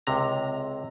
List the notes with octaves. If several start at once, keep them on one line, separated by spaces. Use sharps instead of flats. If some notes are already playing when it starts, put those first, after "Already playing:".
C#2 C3 A#5